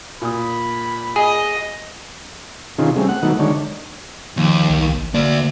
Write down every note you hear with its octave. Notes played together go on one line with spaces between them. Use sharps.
A#2 B5 D#6
G#4 D#5
C3 D#3 C#4 D#4 F4 G#4
G3 A3 C4 C#4 G#4
F#5
D#3 F#3 A3 B3 D#4
D3 D#3 G#3 D4 D#4 C#5
D#2 F3
C2
G#1
D2 A#3 D5